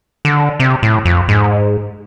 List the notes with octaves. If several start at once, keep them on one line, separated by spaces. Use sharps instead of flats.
D3
C3
A2
F2
G#2